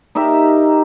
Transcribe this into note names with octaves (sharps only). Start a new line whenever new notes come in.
D#4 G4 A#4 E5